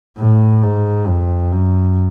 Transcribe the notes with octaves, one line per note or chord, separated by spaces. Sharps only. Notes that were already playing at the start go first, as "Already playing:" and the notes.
A2
G#2
F2
F#2